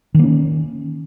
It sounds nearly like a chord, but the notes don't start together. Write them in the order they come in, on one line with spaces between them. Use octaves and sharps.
D#3 A#3 C#4